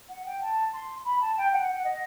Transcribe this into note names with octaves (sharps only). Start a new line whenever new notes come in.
F#5
G5
A5
C6
B5
A5
G5
F#5
F#5
D#5